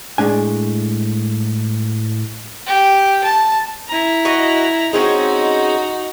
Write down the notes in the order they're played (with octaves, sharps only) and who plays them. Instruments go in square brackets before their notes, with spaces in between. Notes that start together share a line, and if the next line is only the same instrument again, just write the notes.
[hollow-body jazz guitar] A2 G#3 A3 D4 G#5
[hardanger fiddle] G4
A5
E4 A#5
[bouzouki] F#4 B4 D#5
[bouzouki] G#3 C4 C#4 [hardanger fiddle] D#4 F#4